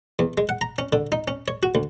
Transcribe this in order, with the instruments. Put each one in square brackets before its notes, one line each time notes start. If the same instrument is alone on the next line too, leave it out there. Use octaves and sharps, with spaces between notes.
[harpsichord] E2
G#3
F#5
A#5
C#4
D3
D#4
C#4
C#5
F#4
D2